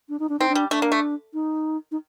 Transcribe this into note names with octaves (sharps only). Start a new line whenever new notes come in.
D4
D#4
D4
C4 D#4
D4
G3
A3 D4
A#3
A3
D#4
D#4